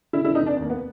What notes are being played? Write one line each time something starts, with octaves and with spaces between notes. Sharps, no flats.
C#3 E4
E4
F1
D#4
F1 D4
D#2
A#3
B3